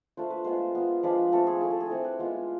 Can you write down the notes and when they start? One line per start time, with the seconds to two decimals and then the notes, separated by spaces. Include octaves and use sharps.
0.17 A3 D4 F4 C5
0.30 B4
0.44 G#3 B3 F4 C5
0.75 B3 F4
1.03 F3 G#3 D4 F4 B4
1.32 A3 C4 F4 A4
1.47 G#4
1.61 A3 E4 G#4
1.71 A4
1.80 G#4
1.90 A3 C4 E4 A4
2.04 B4
2.19 G#3 B3 F4